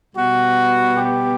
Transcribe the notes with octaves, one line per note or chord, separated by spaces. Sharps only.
B2 G3 B3 F#4
G4